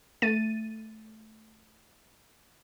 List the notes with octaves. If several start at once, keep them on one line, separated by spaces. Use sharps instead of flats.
A3 A6 D#7